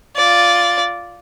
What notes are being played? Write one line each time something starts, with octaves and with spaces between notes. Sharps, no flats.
F4 D5